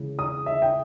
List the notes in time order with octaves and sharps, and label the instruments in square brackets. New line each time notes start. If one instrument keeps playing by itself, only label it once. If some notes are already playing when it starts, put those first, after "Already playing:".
Already playing: [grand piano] C#3 E3 G#3
[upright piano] D#6
E5
G5